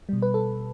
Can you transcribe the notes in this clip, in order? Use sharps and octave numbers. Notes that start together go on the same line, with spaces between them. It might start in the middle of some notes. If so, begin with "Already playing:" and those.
B2 G3
B4
A4